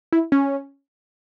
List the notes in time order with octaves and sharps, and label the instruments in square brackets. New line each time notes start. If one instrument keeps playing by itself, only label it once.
[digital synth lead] E4
C#4